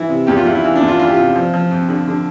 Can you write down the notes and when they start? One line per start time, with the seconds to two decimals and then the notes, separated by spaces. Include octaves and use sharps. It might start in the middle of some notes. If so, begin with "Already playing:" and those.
Already playing: E3 E4
0.09 C3
0.27 E2 G4
0.37 F4
0.45 E2 E4
0.55 E4
0.64 E3
0.75 D4
0.82 E2
0.88 F4
0.99 E3 F4
1.07 G4
1.14 C3 F4
1.36 F3
1.54 F3
1.71 F2
1.88 D3
2.07 D3